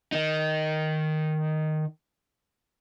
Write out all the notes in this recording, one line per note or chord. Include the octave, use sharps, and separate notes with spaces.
D#3 D#4